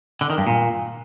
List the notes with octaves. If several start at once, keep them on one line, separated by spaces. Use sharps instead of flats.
D3
D#3
G2
A#2